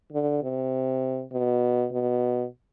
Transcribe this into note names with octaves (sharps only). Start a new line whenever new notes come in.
D3
C3
B2
B2